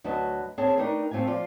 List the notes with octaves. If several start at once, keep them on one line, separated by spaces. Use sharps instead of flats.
D2 F#3 F#4 B4 D#5 A5
C4 G#4 C#5 A5
A3 D4 D#4 G4 A#4 B4
A3 C4 F4 G4 G#5
F3 F4 D5